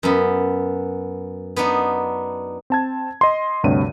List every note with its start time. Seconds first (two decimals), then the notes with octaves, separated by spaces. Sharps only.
0.03 F#2 B3
1.56 B3 D4 D#4
2.70 C4 A5 G#6
3.21 D#5 C6
3.64 D2 G2 C3 C#5 D#7